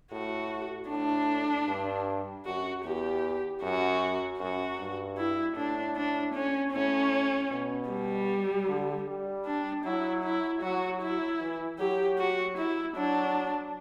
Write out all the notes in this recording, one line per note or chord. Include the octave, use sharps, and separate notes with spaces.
A2 F#4
A2 D4
G2
F#2 F#4
E2 G4
F#2 F#4
F#2 F#4
G2
E4
A2 D4
D4
C#4
A2 C#4
B2
G3
D3
G3
D4
F#3 E4
E4
F#3 F#4
E4
E3
F#3 G4
F#4
E4
F#3 D4